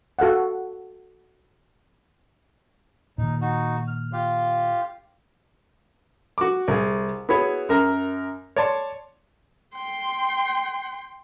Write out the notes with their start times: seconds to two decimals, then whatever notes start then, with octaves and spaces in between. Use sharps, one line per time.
0.19 F#4 A4 F5 F#5
3.18 A#2 D#3 D#4
3.41 D#4 F#4
3.88 F6
4.13 F4 G4 F5
6.38 F#4 D6
6.68 C2 G#4
7.29 B3 E4 F#4 G#4 C#5
7.69 F#2 A#4 A#5
8.56 C#5 D5 A5 C6
9.75 G5 C6